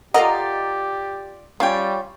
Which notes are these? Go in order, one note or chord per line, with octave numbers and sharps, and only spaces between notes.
F4 G4 A4 A#4 D5 D#5 F#5 A#5
G3 C#4 F4 C#5 G5